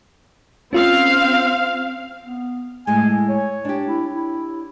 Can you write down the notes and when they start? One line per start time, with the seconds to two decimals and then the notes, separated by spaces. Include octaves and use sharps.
0.73 C4 C#4 F4 F5
2.22 B3
2.87 A2 G#3 G#5
3.29 C#5
3.65 D4 G4
3.88 E4
4.13 E4